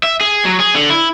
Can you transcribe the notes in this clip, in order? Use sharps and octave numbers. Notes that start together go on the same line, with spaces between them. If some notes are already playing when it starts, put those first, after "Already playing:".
E5
G#4
F#3
G#4
D3
E4